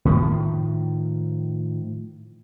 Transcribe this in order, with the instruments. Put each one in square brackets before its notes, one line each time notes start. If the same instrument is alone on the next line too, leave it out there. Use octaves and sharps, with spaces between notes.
[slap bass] A2 D#3 F3